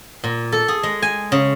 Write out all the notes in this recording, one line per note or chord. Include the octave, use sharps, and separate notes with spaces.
A#2
A4
G#4
G#3
G#5
C#3